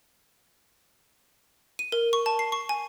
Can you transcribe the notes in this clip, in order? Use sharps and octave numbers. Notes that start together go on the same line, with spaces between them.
D#7
A#4
C#6
A5
C7
C#6
G#5